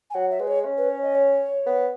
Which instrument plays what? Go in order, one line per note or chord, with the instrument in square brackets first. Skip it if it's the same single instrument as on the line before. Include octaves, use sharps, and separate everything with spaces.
[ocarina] G#5
[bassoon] F#3 [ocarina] F#5
[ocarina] E5
[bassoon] G#3 [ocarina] B4
[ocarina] C#5
[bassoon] C#4
[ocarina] B4
C#5
D#5
C#5
[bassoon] B3